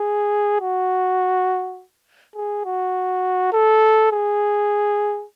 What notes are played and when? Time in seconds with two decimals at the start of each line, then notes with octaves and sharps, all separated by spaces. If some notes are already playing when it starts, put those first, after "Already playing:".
Already playing: G#4
0.61 F#4
2.36 G#4
2.65 F#4
3.53 A4
4.12 G#4